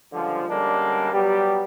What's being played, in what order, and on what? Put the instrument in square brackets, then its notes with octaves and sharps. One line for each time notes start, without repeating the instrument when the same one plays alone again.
[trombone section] C#2 G2 D3 F3
D3 G3 G#3 A#3 C#4 D4
F#3 G3 B3 G4